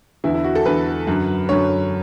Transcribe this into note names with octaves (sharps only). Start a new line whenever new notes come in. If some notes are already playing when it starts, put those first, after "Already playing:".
E2 D3 E4
E4
F#4
A4
E2 D3 B4
F#2 D3
F#2 D3 C#5